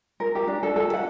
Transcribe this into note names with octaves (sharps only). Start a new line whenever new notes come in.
A#4
G4
D4
A4
A4
F#5